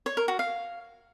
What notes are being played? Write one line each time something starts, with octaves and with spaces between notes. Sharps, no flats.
C#5
A#4
F#4
F5